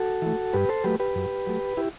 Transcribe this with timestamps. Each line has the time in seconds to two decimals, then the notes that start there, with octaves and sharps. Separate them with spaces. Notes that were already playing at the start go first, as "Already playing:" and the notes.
Already playing: F#4 A4
0.22 E3 A3
0.53 G2 G4 B4
0.69 A4 C5
0.84 F#3 A3 G4 B4
1.00 G4 B4
1.15 F#2
1.47 F#3 A3
1.77 E4 G4